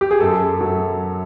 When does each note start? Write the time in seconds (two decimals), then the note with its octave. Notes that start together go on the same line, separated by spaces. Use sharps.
0.01 G4
0.11 G#4
0.20 F#2 A4
0.61 F#3